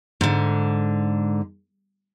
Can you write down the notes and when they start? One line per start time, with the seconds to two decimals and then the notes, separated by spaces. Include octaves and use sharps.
0.21 G#2 D3